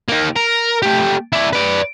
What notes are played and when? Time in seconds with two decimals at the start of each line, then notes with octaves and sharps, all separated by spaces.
0.09 A#3 D#4
0.36 A#4
0.82 A3 G4
1.33 E4 D5
1.53 B4 D5